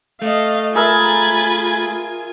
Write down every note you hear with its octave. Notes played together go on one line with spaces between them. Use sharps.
A3 D#5 F5
F4 G#4 A#4 E5 G#5 B5 G#6 A6